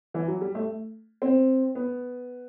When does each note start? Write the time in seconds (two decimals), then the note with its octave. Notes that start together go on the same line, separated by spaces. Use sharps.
0.14 E3
0.28 F#3
0.41 G3
0.55 A3
1.22 C4
1.75 B3